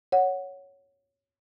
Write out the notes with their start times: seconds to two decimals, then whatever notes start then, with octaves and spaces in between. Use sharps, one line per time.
0.12 C#5 F#5